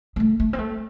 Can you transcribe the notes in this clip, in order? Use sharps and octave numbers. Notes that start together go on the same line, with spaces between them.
G#3
A3
A3
C4
A3